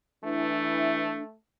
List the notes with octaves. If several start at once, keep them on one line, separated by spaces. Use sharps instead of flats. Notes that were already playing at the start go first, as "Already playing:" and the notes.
E3 A3 D4